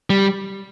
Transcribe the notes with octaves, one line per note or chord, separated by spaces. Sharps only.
G3